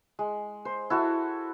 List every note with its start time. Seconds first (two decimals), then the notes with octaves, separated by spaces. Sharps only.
0.19 G#3
0.65 C5
0.90 E4 F#4 A4